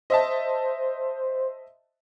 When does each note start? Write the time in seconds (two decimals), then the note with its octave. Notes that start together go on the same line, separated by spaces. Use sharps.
0.10 C5 D#5 E5 A5